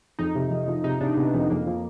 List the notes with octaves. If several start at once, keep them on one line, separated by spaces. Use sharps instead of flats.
F2 D#4
C3
F2
F3
C3 D#4
C3 D4
C3 B3
F2 B3
F2 A#3
F3